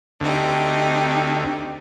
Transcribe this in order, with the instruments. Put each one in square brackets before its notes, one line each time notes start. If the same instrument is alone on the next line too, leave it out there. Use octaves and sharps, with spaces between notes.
[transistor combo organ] D2 [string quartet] C4 D#4 G4